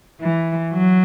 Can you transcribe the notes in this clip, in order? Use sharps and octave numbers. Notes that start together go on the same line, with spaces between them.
E3
F#3